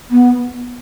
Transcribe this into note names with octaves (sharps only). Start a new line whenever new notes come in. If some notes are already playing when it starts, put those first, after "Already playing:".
B3